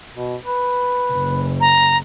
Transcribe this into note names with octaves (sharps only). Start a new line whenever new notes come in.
B2
B4
F#1
A#5